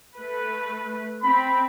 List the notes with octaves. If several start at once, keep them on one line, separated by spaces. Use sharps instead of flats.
A3 B4
C4 B5